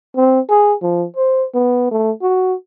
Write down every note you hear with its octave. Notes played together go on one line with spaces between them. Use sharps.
C4
G#4
F3
C5
B3
A3
F#4